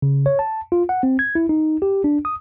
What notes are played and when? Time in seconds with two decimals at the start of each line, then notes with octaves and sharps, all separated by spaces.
0.02 C#3
0.26 C#5
0.39 A5
0.72 F4
0.89 F#5
1.03 C4
1.19 G#6
1.35 E4
1.49 D#4
1.82 G4
2.04 D4
2.25 D#6